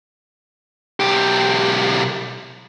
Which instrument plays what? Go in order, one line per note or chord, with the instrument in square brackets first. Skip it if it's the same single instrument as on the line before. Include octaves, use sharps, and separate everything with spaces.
[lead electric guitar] B1 G4